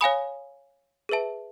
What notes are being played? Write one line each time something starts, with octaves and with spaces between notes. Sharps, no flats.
C#5 F5 G#5 B5 D#6
G#4 B4 E5 A5